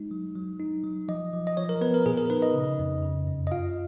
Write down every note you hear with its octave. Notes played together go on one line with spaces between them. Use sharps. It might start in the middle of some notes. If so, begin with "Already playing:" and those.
Already playing: G#3 D#4
F#3
F#3
D#4
F#3
F3 D#5
F3
D#5
F3 C#5
A#4
B3 B4
A#4
A#2 G#4
A#4
D#4 B4
D#5
C#3
F2
C#3
F#2
D#5
F4 F5